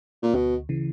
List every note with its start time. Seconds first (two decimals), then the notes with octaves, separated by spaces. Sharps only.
0.23 A#2
0.33 D2 B2
0.69 C#3 E3